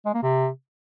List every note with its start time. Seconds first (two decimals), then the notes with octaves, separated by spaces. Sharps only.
0.05 G#3
0.14 A#3
0.23 C3